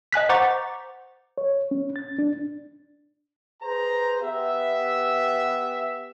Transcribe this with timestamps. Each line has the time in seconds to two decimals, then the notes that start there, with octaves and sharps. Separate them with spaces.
0.12 D#5 G#5 F#6 B6
0.29 C5 F#5 A#5 C#6 D6 A6
1.38 C#5
1.71 C#4
1.96 A6
2.19 D4
3.63 G#4 B4 C5 A#5
4.22 B3 G4 E5